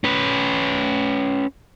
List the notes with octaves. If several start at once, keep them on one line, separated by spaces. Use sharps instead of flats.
C#4 B4